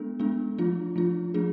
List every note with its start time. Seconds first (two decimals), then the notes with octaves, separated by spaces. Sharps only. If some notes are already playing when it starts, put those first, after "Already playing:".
Already playing: G#3 B3 D4 A4
0.19 G#3 B3 D4 A4
0.58 F3 A3 D4 F4
0.96 F3 A3 D4 F4
1.34 F3 A3 D4 G#4